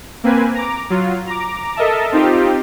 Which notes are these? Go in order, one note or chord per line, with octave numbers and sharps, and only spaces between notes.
A#3 C4 B4 G#5
A#5 D6
F#3 F4
A#5 D6
A4 A#4 D#5 E5 A5
C4 D#4 F4 G4